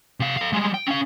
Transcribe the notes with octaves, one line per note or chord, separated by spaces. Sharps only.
C3 F5
A4 F5
G3 G#3
G5
C#4 F5